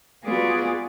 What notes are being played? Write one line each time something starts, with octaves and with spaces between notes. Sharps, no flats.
G3 B3 F4 F#4 G#4 D5